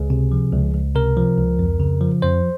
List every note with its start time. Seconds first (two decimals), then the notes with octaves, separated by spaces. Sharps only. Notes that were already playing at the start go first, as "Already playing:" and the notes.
Already playing: C#2 G#4
0.10 C3
0.32 F3
0.53 C#2
0.74 C#2
0.95 C3 A#4
1.17 F3
1.38 C#2
1.59 F2
1.80 C#3
2.01 F3
2.22 F2 C5